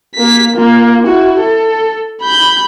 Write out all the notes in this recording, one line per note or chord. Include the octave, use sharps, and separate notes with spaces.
A#3 B6
A#3 F4
E4 F#4
A4
B5 G6